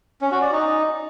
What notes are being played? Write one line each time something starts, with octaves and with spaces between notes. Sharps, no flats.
C#4
F#4
D5
D#4